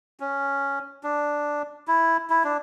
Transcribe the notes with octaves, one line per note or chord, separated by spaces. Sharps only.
C#4
D4
E4
E4
D4